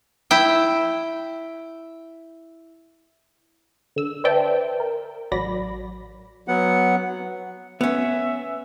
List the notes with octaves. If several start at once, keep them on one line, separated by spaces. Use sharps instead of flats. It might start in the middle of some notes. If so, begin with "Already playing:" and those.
E4 G5
D3 E6
B4 C5 D5 E5 G5 A5
A#4
A1 F#3 D5 B5 A#6
F#3 B3 F#5
B3 C#4 E5